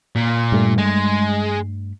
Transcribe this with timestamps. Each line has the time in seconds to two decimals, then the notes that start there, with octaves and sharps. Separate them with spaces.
0.15 A#2
0.52 G2 G3 A3
0.78 G#3